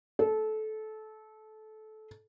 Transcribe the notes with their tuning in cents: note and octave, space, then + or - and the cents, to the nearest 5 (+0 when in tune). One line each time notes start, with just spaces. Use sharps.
A4 -20